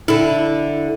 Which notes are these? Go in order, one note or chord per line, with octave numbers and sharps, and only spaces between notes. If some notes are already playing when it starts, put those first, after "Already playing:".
D3 E4